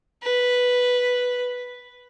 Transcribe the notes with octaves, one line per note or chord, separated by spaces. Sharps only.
B4